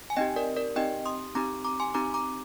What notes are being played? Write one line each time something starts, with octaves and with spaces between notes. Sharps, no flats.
G#5
C4 D#4 G4 D#5 G5
A#4 D5
A#4 D5
C4 D#4 G4 D#5 G5
C6 D#6
C4 D#4 G4 A#5 D6
A#5 D6
G#5 C6
C4 D#4 G4 A#5 D6
A#5 D6